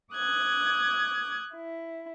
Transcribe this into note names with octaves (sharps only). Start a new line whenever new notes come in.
D6 D#6 F#6 G#6
E4